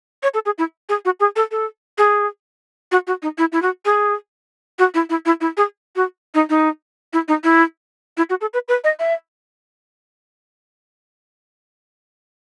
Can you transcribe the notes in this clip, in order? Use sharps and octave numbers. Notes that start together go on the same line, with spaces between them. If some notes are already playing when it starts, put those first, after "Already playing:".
C#5
A4
G#4
E4
G#4
F#4
G#4
A4
A4
G#4
F#4
F#4
D#4
E4
E4
F#4
G#4
F#4
E4
E4
E4
E4
G#4
F#4
D#4
D#4
E4
D#4
E4
E4
F#4
A4
B4
B4
D#5
E5